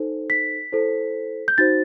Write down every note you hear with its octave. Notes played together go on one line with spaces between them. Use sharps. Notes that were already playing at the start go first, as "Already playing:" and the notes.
Already playing: D#4 A4 C5
B6
E4 A4 C5
G6
D#4 F#4 C5 A6